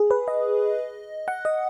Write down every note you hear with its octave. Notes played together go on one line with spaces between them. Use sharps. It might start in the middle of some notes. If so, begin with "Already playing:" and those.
Already playing: G#4
B4
D#5
F#5
D#5